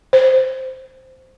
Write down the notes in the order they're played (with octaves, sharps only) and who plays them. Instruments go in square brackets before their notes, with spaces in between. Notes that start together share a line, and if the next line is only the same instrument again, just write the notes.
[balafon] C5